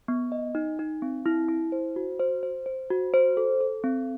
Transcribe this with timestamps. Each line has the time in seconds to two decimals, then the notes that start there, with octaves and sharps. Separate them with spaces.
0.08 B3
0.32 D#5
0.55 D#4
0.79 D#4
1.02 C4
1.26 E4
1.49 E4
1.72 C5
1.96 F#4
2.20 C5
2.43 C5
2.66 C5
2.90 F#4
3.14 C5
3.37 A4
3.60 A4
3.84 C4